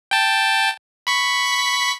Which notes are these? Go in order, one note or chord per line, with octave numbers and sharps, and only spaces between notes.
G5 A5
B5 C#6 B6